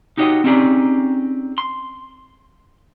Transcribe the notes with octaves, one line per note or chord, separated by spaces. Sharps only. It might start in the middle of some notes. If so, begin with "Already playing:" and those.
D#4 F#4 G4 C#5 D#5
C4 C#4 D#4 G4 G#4 D5
C6